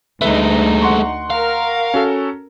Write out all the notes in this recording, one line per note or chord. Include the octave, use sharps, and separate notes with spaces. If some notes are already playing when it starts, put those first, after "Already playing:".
D2 G#3 A3 D#4 B4 E5
F#5 C6 C#6
A#4 F5
C#4 F#4 A4